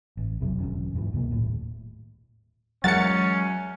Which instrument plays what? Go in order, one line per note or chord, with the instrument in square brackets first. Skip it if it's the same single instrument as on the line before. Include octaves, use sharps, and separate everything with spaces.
[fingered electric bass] A1
F1 E2 C3 F#3
E1 D#2 D3 C#4
F2 G#2 D3 E3
C2 B2 A#3
D#1 A2
[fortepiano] E2 F#4 A#4 [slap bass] F#3 G#3 [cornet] C#4 [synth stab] A6 C#7